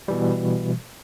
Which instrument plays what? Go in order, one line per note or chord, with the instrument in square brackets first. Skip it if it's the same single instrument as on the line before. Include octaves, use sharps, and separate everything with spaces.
[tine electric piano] B2 E3 G3